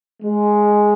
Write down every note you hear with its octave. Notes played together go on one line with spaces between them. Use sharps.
G#3